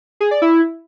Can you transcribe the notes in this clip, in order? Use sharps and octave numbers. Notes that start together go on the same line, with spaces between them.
G#4
D5
E4